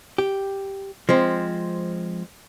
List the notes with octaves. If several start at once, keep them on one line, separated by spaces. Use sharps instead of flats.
G4
F3 G#3 C4